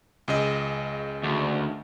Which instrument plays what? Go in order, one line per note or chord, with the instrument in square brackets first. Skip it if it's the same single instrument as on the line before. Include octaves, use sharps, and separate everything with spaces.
[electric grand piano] C#2 C#3 D#5
[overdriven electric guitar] D2